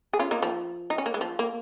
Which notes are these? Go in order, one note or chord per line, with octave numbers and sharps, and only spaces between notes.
G#4
C#4 F4
A#3 D#4
F3
D#4
C#4
A#3
G#3
F3
A#3